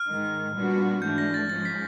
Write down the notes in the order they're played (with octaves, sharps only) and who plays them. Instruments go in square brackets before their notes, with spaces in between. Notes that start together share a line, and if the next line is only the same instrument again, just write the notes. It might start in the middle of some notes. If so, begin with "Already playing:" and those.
Already playing: [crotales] F6
[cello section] G#2 D#3 G#3
A#2 G3 B3 D4 F#4
[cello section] G#2 E3 A3 D4 [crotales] G6
[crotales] A#6
A6
[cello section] G#2 F3 G#3 C#4 [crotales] A6
[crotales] B6